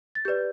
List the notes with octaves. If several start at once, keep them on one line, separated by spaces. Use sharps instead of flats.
A6
G4 B4 D5 G6